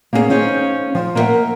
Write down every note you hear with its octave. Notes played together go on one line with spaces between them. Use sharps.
A#3 B3 C#4 F#4 G#4
C#4 D#4 C5 F5
F3
A#3 A#4 B4 D5 E5 F#5